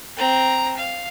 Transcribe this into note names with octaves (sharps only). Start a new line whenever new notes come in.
C4 A#5
F5